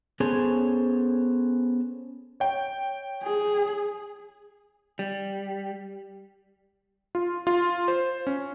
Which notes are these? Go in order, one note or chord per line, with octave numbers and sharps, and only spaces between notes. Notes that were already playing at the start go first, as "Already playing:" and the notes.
B3 C#4 G#4 A4 C5 C#5
C#5 G5
G#4
G3
F4
F4
C5
C#4